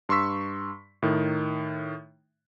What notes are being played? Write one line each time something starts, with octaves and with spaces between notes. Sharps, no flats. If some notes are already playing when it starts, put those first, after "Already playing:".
G2 C6 C#6 E6 B6
A2 D#3